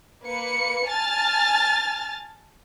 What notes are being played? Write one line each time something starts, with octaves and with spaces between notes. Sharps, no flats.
A#3 B4 C#7
G#5 A5 F6 A6